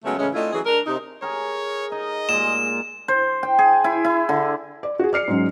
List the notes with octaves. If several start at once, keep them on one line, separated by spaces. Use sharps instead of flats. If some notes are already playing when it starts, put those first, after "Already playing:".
C#3 F#3 G#3 A3 B3 C#4
A2 C#3 E3 G#3 C#4
A3 C4 D4 E4 F4 D#5
E3 F#3 C#4 G#4
D4 A#4
C3 D#4
G#4 A#4 C#5
D#4 D#5
A#2 G#3 E7
C5
G5
G#4
E4
E4
D3
D5
F#4 G#4
D5 F6 C7 C#7
G#2 F#3 C#4